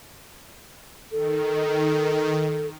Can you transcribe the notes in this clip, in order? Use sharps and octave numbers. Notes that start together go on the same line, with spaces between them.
D#3 A4